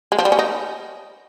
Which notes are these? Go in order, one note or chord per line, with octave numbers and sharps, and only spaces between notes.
G#3
F3
G3
C#4
D#4